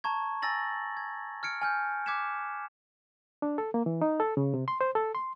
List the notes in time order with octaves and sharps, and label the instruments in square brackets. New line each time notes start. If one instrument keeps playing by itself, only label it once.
[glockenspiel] A5 A#5 C#6 G#6
G#5 A#5 E6 A6 A#6 F#7
G#6
F6 G#6 C#7 D7
G#5 F6 G6
D6 F#6 G#6 B6 C#7 E7
[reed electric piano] D4
A4
A#3
E3
D#4
A4
C#3
C3
C6
C5
A4
C6